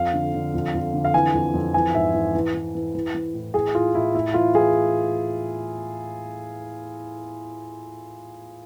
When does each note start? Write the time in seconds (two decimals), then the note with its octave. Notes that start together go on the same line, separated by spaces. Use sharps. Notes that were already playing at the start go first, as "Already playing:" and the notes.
Already playing: F2 F5
0.13 D3
0.34 D3
0.54 F2
0.74 F2
0.94 D3
1.05 F5
1.14 E3 G#5
1.34 F2
1.54 F2
1.74 E3 G#5
1.94 G#2 E5
2.14 E3
2.35 E3
2.54 E3
2.75 E3
2.95 E3
3.14 E3
3.34 A2
3.54 E3 G#4
3.75 A2 F4
3.94 A2 E4
4.14 A2 E4
4.34 E3 F4
4.55 E3 G#4